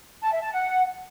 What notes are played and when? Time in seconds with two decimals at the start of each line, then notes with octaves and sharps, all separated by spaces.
0.22 A5
0.32 E5
0.41 A5
0.51 F#5